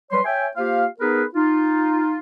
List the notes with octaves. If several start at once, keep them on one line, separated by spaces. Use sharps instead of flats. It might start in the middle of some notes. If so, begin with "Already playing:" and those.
F#3 G3 B4 C#5 C6
C#5 E5 G5 G#5
A#3 F4 G4 C5 F5
B3 D#4 G#4 A#4 B4
D#4 F4